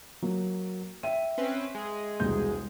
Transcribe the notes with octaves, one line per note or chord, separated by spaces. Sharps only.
F#3 A#3
E5 G5 D#7
C4 C#4 B4
G#3 G#4
E1 C2 G6